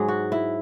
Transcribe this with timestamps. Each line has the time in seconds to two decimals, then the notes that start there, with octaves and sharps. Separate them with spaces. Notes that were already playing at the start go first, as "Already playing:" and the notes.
Already playing: G#2 F#3 G#4
0.08 F#4
0.32 E4